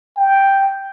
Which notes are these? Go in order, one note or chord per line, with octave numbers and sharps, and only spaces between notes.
G5